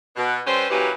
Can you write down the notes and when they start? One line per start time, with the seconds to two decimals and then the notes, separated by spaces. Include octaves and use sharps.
0.17 B2
0.46 G3 C#4 A4 B4 C5
0.71 A#2 E3 F#3 C#4 G4 B4